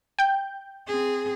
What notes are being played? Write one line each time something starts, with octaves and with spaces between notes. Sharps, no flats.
G5 G6
C4 G#4